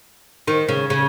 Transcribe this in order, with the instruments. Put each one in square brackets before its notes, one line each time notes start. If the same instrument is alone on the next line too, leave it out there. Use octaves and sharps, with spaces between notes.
[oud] D#3
C#3
C#3